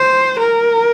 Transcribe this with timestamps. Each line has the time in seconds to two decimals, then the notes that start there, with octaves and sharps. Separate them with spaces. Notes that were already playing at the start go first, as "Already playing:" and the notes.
Already playing: C5
0.39 A#4